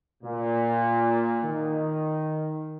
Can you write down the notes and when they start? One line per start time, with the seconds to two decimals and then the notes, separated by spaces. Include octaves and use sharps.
0.23 A#2
1.44 D#3